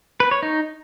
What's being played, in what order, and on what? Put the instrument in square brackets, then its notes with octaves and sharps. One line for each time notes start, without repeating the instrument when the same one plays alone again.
[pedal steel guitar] B4
C#5
D#4